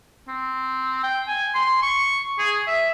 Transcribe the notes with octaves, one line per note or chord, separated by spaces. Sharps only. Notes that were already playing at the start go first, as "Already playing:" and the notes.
C4
G5
G#5
C6
C#6
G#4
E5